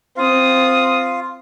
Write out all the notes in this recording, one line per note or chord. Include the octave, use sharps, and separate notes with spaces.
C4 F4 F5 D#6